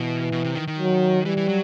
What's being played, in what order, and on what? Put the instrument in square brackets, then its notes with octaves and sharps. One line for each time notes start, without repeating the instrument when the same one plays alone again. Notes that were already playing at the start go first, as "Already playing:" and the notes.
Already playing: [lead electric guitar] B2 [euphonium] E3
[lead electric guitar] B2
C3
D#3
D#3
[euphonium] F#3
[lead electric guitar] E3 [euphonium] G3
[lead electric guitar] E3
F#3